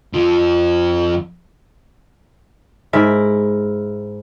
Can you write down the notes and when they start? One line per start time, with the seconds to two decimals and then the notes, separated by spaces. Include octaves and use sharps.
0.13 F2 F3
2.93 G#2 E4 A#4 E5